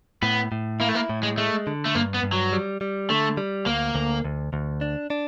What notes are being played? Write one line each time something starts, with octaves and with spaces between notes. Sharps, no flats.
A2 B3
A2
A#3 E4
A3
A#3
A2
G#3
G#3 A3
D3
A3
G2 A#3
B3
G2
F#3
G3
G3
D3 A3
G3
D2 A#3
D2
D2
D2
D4
D4